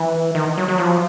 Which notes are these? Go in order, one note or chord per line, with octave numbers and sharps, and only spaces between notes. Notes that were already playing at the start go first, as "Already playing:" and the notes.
Already playing: E3
D#3
F#3
F#3
F3